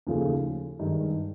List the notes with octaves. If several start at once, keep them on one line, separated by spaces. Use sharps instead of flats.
D#2 C#3 F3 A3
G2 D#3 G#3